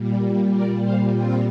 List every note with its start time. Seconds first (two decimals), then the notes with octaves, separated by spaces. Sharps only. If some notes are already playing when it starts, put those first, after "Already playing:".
Already playing: A#2 G3
0.53 A#4 D5
0.84 C5 F5
1.14 C4 F4